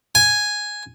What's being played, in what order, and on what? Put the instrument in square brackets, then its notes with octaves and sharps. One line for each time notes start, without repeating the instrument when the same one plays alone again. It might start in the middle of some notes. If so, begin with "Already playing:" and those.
[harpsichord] G#5